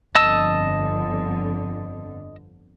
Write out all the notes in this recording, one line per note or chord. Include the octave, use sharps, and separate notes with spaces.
G1 F2 D3 D#5 A5 E6